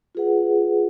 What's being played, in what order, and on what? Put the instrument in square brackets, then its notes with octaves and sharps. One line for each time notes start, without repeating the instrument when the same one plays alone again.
[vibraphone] F4 G#4 B4 F#5